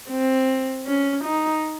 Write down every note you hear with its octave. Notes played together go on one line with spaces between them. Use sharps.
C4
C#4
D#4